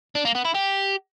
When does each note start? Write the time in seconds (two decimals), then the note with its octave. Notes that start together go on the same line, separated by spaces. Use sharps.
0.15 D4
0.25 A#3
0.35 B3
0.45 E4
0.54 G4